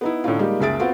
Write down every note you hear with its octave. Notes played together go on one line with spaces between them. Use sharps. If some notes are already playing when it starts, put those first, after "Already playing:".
B3 D#4 E4
A2 D3 A3 C#4 D#4 F4
G3 G#3 A#3 D#4 F4 G4
F#1 C#2 G#4 E5 A6 D7
B3 C4 F4 F#4